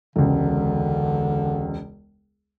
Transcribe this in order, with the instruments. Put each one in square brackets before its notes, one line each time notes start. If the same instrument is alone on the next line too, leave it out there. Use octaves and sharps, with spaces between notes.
[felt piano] E1 C#2 [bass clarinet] D3